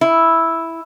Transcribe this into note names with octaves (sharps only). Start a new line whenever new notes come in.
E4